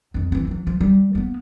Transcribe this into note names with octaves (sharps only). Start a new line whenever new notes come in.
F2 D#3
E3 C4
E3 F#3
F3
G3
A#3 B3